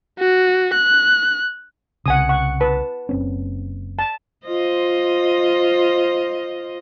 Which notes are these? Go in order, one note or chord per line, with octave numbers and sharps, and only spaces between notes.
F#4
F#6
C2 C#3 F#5 G#5 D#6
F#5 C#6
B4 A5
F#1 C4 C#4
A5
F4 C5 D#5